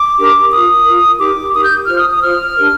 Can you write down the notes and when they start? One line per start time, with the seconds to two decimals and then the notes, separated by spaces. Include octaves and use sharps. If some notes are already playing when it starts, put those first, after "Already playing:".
Already playing: D6
0.18 D4 G4 A#4
0.52 F4 A#4 D#6
0.85 F4 A#4
1.19 D#4 G4 A#4 D6
1.53 D#4 G4 A#4 D#6
1.65 G6
1.87 F4 C5 F6
1.98 D#6
2.10 D#6
2.21 F4 C5 F6
2.55 D4 G4 A#4